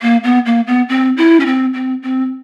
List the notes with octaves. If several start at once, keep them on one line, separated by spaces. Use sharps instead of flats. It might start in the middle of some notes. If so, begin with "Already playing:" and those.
A#3
B3
A#3
B3
C4
E4
C#4
C4
C4
C4